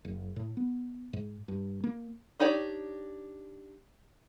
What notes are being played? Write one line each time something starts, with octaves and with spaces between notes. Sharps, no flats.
F#1
A2
B3
G#2
G2
A#3
D4 D#4 G4 C#5 D5